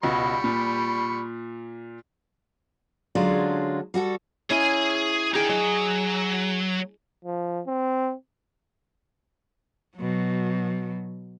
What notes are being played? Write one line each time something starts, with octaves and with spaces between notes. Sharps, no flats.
C#2 B2 G3 B5 C#6
A#2
D3 F#3 G#3 C#4 D4 F4
G3 F#4 G4 A4
C#4 E4 G#4 D#5 G#5
D4 D#4 G#4 G5
F#3 D#5
F3
C4
B2 F#3